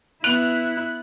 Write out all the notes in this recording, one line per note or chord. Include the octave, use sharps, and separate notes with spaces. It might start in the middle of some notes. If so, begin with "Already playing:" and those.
B3 E4 F#6 F7